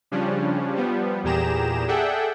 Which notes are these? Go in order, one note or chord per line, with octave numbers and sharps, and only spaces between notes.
C#3 F3 G3 C#4 D4
F3 G3 B3
E2 A#2 G4 G#4 A#5 E7
G#4 A4 D5 E5 F#5 G5